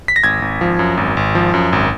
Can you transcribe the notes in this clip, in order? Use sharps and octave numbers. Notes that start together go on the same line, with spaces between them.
B6
A#6
G#1 G#6
G#1
F3
F#2
G#1
G#1
F3
F#2
G#1